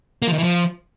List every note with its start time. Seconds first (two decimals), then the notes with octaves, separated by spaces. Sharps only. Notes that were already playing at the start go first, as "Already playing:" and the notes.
0.22 A#3
0.28 F3
0.33 D#3
0.38 E3
0.43 F3